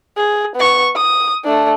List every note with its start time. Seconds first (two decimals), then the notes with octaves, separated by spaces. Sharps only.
0.17 G#4
0.55 B3 C#6
0.96 D#6
1.44 A3 D4